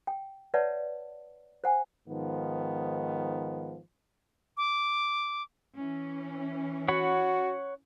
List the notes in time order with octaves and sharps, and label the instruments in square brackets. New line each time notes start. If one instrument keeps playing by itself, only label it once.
[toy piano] G5
B4 C#5 D5 E5 F#5 A5
C5 F#5 G#5
[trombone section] G#2 D#3 F3 B3
[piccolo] D6
[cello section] E3 C#4
[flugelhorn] F#4 [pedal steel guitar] C#5 F#5 B5